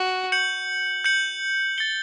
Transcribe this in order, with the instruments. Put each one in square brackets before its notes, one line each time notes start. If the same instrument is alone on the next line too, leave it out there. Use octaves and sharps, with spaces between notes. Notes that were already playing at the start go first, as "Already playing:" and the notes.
Already playing: [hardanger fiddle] F#4
[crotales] G6 C#7 F#7
G6 C#7 F#7
A6 C#7 G7